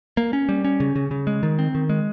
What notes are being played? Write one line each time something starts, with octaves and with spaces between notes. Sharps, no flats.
A#3
C#4
G3
C#4
C#3
C#3
C#3
G#3
D#3
C4
D#3
G#3